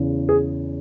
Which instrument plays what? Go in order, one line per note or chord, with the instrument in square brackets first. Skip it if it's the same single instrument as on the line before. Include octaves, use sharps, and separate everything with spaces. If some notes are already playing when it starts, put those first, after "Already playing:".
Already playing: [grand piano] E2 C#3 E3
G#4